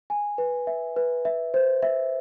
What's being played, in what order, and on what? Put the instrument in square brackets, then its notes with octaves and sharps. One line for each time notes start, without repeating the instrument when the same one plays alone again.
[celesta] G#5
B4
E5
B4
E5
C5
E5